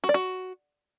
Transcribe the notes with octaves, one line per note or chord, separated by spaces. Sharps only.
F#4
D5
F#4